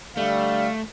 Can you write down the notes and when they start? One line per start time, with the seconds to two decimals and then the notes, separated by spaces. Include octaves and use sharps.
0.17 D3 G3 A3 F5